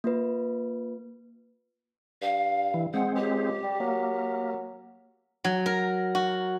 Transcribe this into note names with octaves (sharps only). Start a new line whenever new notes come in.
A#3 F4 B4
G2 F5
E3
G#3 C4 F#5
C#2 G4
G3
F#3 A#3
F#3
A#4
F#4